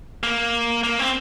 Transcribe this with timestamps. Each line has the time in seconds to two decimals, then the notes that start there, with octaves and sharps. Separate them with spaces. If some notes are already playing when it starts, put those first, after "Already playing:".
0.23 A#3
0.83 A#3
0.99 C4